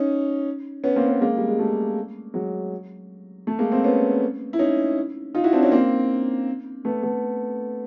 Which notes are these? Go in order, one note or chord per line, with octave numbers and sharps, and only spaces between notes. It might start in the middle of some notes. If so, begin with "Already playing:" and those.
Already playing: C#4 D#4
B3 C#4
A#3 C4
B3 C#4
G#3 A#3
G3
G#3
G3 A3
F#3 G#3
A3
G#3 A#3
A#3 C4
B3 C#4
E4
C#4 D#4
D#4 F4
E4 F#4
C4 D4
C#4 D#4
A#3 C4
A3 B3
A3 B3